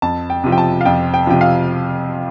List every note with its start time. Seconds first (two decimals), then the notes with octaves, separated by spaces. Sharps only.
0.02 F2 A5
0.30 G5
0.44 C3 F3
0.52 G5
0.58 A5
0.81 F5
0.85 F2 G5
1.14 G5
1.27 C3 F3 G5
1.41 F5